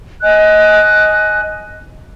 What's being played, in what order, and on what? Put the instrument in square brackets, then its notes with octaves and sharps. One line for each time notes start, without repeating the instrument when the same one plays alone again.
[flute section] D#5 G#5 F#6